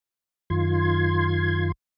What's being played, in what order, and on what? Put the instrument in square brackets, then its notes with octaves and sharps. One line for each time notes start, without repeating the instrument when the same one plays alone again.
[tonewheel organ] F#2 D#3 F4 C6 G#6